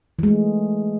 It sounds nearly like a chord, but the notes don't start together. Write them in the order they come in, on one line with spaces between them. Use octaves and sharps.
E3 G#3 A3